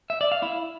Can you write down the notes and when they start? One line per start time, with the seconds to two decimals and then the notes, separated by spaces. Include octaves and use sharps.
0.10 E5
0.21 D5
0.32 F5
0.42 E4